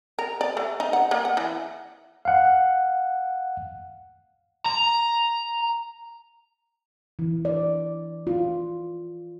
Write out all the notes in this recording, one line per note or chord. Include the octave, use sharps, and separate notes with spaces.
A#4
D5
A3
D#4
F#5
A#3
F#5
E3
F5 F#5
A#5
E3
D5
F4